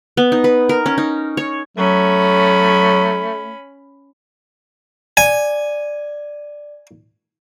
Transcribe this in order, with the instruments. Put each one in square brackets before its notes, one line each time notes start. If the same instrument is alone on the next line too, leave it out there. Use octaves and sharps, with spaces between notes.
[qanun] B3
D#4
B4
A#4
C#4
D#4
C#5
[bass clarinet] F#3 [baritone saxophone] A3 [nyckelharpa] C#4 B5
[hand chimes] D5 [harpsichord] G#5